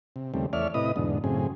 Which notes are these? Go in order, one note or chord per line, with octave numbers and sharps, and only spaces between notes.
C3
D#2 C#3 G3 A3 C4
E2 A3 C#5 D5 E5 F6
A2 C3 E4 B4 D#5 D#6
E2 G#2 B2 D3
F#2 A2 C#3 C4 G#4